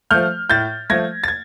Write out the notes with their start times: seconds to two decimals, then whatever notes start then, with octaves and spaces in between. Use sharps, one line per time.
0.11 F3 A3 F6 G6
0.50 A2 G6 A6
0.90 F3 A3 G#6 A#6
1.24 A6
1.28 G#6